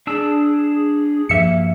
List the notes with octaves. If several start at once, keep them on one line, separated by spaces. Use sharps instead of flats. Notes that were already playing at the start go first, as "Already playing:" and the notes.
D4 G#4 A5 E6
G2 F3 A#3 E5 C#7